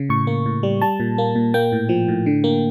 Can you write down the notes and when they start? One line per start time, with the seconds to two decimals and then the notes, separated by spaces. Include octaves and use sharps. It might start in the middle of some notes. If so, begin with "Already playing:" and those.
Already playing: C#3
0.09 A2 C#6
0.27 A#3
0.46 A2
0.63 G3
0.82 G3 A5
1.00 A#2
1.18 A#3
1.35 A#2
1.54 A#3 G5
1.72 A2
1.89 F3
2.08 A2
2.26 D3
2.44 A#3